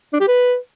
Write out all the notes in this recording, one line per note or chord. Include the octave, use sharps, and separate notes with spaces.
D4
G4
B4